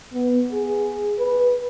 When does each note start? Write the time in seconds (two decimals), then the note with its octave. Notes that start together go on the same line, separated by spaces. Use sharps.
0.14 B3
0.52 G#4
1.19 B4